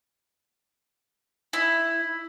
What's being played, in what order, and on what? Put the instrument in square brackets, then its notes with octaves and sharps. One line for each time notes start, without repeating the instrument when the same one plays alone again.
[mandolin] E4